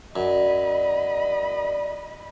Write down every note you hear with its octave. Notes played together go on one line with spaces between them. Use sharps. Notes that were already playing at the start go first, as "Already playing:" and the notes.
F#2 D5 D#5 B5